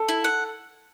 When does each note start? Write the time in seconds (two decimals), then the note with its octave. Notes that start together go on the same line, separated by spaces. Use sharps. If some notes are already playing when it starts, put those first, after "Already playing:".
Already playing: A4
0.08 E4
0.24 F#5